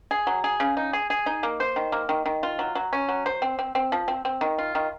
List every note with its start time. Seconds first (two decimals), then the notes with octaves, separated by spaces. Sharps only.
0.11 G#4
0.27 F#3
0.44 G#4
0.60 C#3
0.77 D#4
0.93 G#4
1.10 G#4
1.26 D#4
1.43 A#3
1.60 C5
1.76 D#3
1.92 A#3
2.09 D#3
2.26 D#3
2.43 F4
2.59 F#3
2.75 F#3
2.93 C#4
3.08 F#3
3.26 C5
3.42 C4
3.59 C4
3.75 C4
3.92 F3
4.08 C4
4.25 C4
4.41 D#3
4.58 F4
4.75 D#3